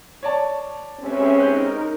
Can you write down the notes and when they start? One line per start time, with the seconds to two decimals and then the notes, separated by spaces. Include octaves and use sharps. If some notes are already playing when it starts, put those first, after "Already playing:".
0.23 C#5 D5 A5
1.00 G#3 C4 C#4 G4 B4 E5
1.40 D#4 A#4 F#6 G6